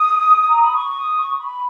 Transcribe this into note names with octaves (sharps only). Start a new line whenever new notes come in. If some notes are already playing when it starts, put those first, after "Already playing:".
Already playing: D#6
A#5
B5
C#6
D#6
C#6
B5